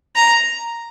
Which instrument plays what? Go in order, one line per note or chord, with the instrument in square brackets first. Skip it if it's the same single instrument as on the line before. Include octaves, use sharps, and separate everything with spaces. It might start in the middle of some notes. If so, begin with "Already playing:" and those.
[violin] A#5